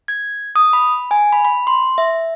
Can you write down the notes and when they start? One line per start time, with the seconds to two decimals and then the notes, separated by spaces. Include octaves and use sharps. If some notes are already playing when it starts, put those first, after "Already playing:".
0.08 G#6
0.56 D#6
0.73 B5
1.11 G#5
1.33 B5
1.45 B5
1.67 C6
1.98 E5